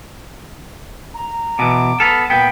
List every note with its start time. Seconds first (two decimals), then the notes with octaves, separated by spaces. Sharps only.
1.14 A#5
1.59 B2 E3 D6
2.00 B3 A4 F6
2.30 A#2 B3 G5